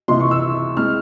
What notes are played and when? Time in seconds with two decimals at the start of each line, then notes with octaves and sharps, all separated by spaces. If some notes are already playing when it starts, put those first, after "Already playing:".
0.08 C#2 C3 E3 C6
0.20 C#6
0.31 E6
0.76 E3 G#3 C4 F6